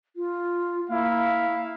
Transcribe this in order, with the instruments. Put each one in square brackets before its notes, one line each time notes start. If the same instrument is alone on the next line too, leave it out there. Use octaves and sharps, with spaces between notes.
[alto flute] F4
[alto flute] A#3 [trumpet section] E4 F5